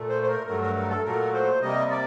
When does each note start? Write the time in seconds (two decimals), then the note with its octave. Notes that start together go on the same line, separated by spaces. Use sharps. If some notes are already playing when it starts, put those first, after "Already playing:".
Already playing: A#2 A3
0.09 C5
0.23 C5
0.28 A#4
0.47 G2 F#3 A3 A#4
0.62 A#4
0.76 A#4
0.90 A4
1.05 A#2 F#3 A3 A#4
1.33 C5
1.61 C3 G3 A#3 D#5
1.90 D5